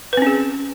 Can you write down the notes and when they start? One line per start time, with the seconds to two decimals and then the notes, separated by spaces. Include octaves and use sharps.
0.13 B4
0.17 C4
0.22 C#4
0.26 G#4